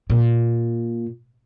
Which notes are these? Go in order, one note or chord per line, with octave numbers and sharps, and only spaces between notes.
A#2